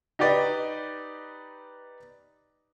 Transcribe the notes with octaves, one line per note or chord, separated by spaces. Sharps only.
D#4 G4 B4 D5 D#5